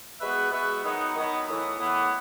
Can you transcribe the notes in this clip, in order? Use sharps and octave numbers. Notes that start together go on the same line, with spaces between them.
G#3 B3 F#4 B4 E5
G#3 B3 F#4 B4 E5
D#3 F#3 B3 D#4
D#3 F#3 B3 D#4
A2 E3 B3
A2 E3 B3